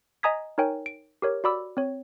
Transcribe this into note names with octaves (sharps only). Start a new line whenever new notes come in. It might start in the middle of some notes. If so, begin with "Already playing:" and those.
D#5 G#5 A#5 D#6 G#6 B6
D#4 A#4 C#5 G5 G#5
D7
G4 A#4 C#5
F#4 D5 B5 D6 E6
C4 C#5